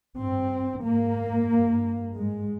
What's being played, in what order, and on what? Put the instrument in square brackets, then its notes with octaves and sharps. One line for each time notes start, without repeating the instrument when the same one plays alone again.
[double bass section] G2 C4
G#2 A#3
G2
G#2 G#3